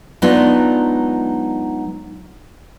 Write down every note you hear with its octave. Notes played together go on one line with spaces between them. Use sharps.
F#3 G#3 B3 D4 D#4 F4